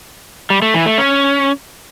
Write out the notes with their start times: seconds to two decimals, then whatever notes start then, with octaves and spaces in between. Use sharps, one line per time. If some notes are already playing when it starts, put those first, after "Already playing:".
0.50 G3
0.62 A3
0.74 E3
0.86 A3
0.98 C#4